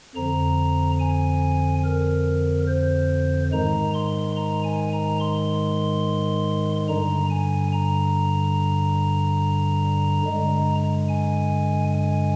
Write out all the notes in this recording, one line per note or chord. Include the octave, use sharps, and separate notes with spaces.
F2 D3 F3 A#5
G#5
A#4
C5
G#2 D#3 G#3 A#5
C6
A#5
G#5
A#5
C6
G2 D3 G3 A#5
G#5
A#5
G2 D3 G#3
G#5
G#5